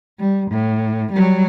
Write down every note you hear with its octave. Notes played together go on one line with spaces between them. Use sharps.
G3
A2
F#3 G3